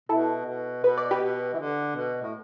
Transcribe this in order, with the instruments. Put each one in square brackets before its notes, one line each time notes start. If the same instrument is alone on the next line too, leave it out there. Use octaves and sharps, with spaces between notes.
[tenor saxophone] B2 [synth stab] E4 A4
[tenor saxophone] B2
[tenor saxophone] B2 [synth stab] B4
[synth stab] D5
G4 B4
[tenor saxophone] B2
E3
D3
B2
A2